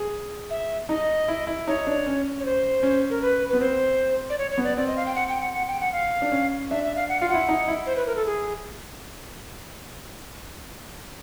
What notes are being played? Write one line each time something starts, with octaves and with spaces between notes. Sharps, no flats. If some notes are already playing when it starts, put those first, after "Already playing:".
Already playing: G#4
E5
D#4 D#5
E4
E4
D#4 C#5
D4
C#4
C#5
C5
C#4
A#4
B4
B3 B4
C4 C5
D5
C#5
C#5
B3
D5
C4 D5
D#5
F5
G5
F#5
G5
F#5
F#5
G5
F#5
F5
D4
C#4
D4 E5
E5
F5
F#5
F4 F5
F#5
E4
D#4
E4
C5
B4
A#4
A4
G#4